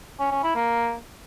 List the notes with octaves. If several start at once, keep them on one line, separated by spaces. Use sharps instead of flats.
C#4
C#4
E4
A#3